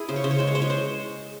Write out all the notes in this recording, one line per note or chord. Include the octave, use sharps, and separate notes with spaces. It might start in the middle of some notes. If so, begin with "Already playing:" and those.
Already playing: E4 G#4
C#3 C5
C#5
C#3 C5
C#5
G#3 C5
C#5
G#3 C5
C#5
C5